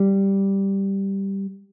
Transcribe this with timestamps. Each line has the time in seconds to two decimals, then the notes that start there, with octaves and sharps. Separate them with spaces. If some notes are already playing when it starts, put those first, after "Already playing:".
Already playing: G3